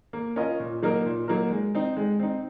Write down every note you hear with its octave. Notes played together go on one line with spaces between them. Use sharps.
A#3
C#4 F4 A#4 D#5
A#2
F#3 A#3 D#4 A#4
A#2
F#3 A#3 D#4 A#4
G#3
C4 D#4
G#3
C4 D#4